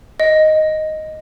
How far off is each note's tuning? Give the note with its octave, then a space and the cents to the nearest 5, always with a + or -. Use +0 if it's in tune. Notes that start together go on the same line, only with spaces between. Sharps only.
D#5 +0